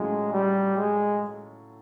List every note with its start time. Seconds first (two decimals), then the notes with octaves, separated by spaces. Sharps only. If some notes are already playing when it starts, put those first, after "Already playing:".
Already playing: A2 F#3 G#3 A3 C#4 F4
0.33 G3
0.77 G#3